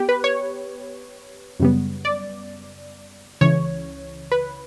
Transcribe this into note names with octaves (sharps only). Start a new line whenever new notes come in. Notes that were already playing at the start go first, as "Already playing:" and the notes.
Already playing: B3 G4
B4
C#5
F#2 C#3 G3 B3
D5
C#2 C#3 E3 C#5
B4